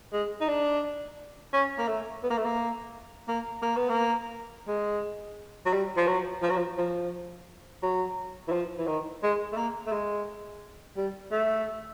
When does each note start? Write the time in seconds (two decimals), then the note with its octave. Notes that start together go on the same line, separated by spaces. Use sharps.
0.13 G#3
0.41 D#4
0.48 D4
1.53 C#4
1.78 A#3
1.88 A3
2.23 B3
2.30 A#3
2.38 A3
2.45 A#3
3.28 A#3
3.62 A#3
3.76 B3
3.89 A#3
4.67 G#3
5.66 F#3
5.73 G3
5.97 F3
6.07 F#3
6.42 F3
6.50 F#3
6.56 F3
6.78 F3
7.82 F#3
8.47 E3
8.52 F3
8.78 E3
8.87 D#3
9.23 G#3
9.52 A3
9.57 A#3
9.86 A3
9.92 G#3
10.97 G3
11.32 A3